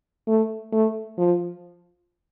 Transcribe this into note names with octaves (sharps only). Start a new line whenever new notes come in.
A3
A3
F3